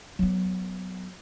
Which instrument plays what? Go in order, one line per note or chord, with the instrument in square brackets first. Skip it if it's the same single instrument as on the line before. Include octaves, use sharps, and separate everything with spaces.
[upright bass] F#3 B3